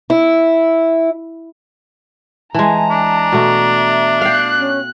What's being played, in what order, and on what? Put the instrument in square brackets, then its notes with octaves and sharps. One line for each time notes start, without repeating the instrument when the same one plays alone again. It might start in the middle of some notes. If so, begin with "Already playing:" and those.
[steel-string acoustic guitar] E4
[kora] E3 G#3 [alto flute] A5 [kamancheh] A#5
[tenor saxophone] D4
[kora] B2 A3
[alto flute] E5
[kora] F5 G5 [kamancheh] F#6
[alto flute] C#4